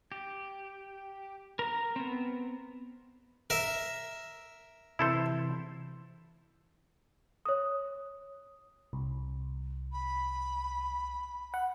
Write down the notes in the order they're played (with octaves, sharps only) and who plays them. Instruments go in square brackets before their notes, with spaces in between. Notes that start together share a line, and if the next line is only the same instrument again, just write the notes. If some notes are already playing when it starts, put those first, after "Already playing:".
[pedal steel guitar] G4
A#4 A#5
B3 C4
[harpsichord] A#4 E5
[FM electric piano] C3 E3 [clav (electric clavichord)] E4 A4 C5
[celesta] C#5 D#6
[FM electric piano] C2
[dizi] B5
[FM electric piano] F#5